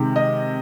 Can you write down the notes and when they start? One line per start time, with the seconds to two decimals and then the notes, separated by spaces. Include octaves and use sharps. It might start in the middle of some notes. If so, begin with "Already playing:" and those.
Already playing: C3 D#3 G#3
0.16 D#5